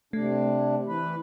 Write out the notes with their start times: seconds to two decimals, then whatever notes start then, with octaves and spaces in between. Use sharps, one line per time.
0.13 C3 A3 D4
0.86 E3 B4